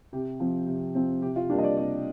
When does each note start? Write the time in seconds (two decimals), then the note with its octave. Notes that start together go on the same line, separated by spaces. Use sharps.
0.13 C3 G4
0.40 F3 C4
0.67 C3
0.95 F3 C4
1.22 C3 G4
1.36 F4
1.50 G3 A#3 D4 G4
1.58 D#5
1.64 D5
1.77 C3 D5